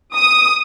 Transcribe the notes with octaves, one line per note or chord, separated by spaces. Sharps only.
D#6